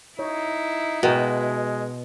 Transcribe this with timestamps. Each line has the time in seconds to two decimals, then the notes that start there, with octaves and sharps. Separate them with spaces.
0.19 D#4 E4 C#5
1.03 B2 G#3 F#4 A#4 G5